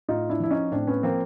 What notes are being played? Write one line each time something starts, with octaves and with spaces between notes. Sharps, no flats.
A2 D#4 F4
D4 E4
F3 E4
C#4 D#4
A2 C4 D4
B3 C#4
F3 A#3 C4